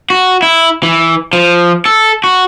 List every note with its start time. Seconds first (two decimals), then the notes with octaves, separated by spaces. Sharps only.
0.10 F#4
0.42 E4
0.83 E3
1.33 F3
1.86 A4
2.24 F#4